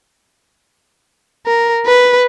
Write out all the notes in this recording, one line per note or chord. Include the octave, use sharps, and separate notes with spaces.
A#4
B4